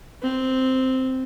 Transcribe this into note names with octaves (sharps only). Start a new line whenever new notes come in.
C4